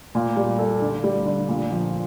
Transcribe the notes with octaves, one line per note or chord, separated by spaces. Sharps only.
A#2
G3
A4
D3
G3
D3
A#2
F3